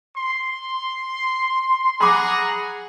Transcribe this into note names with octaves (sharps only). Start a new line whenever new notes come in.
C6
G#4 F#5 A#5 B5 D6